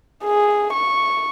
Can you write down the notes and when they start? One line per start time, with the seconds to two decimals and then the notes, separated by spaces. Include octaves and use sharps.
0.24 G#4
0.73 C#6